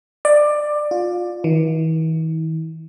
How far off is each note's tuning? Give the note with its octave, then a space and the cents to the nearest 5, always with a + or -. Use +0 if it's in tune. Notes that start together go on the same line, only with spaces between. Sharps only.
D5 +15
F4 +20
E3 -45